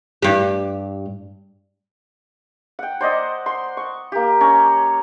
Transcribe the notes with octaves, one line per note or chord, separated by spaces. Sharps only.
G2 G4
F#5 G5
C5 D5 D#5 F#5
C6
C#6
A#3 G4
C#4 C#5 A#5